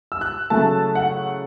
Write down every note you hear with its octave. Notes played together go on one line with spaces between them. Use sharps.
E6
F#6
C#3 F#3 A3 E4 A5
F#5